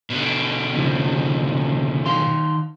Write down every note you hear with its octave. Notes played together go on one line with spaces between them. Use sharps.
B2 D3
D#2 C#3 F3
D#3 F5 C6